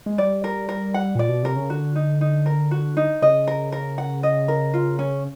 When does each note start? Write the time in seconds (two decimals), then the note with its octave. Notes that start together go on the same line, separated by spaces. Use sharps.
0.06 G#3
0.18 G3 D5
0.44 A#4
0.69 A#4
0.94 F#5
1.15 A#2 D5
1.29 B2
1.43 C3 A#4
1.56 C#3
1.70 D3 F#4
1.96 D#4
2.21 D#4
2.46 A#4
2.71 F#4
2.97 D#4
3.22 C#3 D#5
3.47 A#4
3.72 A#4
3.98 F#5
4.23 D#5
4.48 A#4
4.74 F4
4.99 C#4